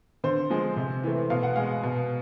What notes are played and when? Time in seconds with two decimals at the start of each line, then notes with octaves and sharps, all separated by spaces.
0.24 D3 C5
0.50 F3 G#3
0.76 C3
1.04 E3 A3
1.30 B2 F5
1.43 F#5
1.56 G#3 F5
1.83 B2